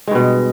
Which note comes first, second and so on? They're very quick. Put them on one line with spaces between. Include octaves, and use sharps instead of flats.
G#3 G2 B2